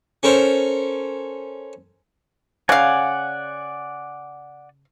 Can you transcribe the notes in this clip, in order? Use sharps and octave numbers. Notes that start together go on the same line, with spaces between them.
C#4 A4 A#4 C5
C#3 D5 F5 F#5 G#5